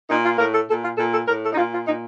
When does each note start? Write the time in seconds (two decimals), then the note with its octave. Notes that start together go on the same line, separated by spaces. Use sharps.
0.09 A#2 D#4
0.24 F4
0.38 A2 A#4
0.53 A4
0.68 A#2 A4
0.83 F4
0.97 A#2 A4
1.12 A4
1.27 A2 A#4
1.42 A4
1.52 D#4
1.57 A#2 F4
1.72 F4
1.86 A#2 D#4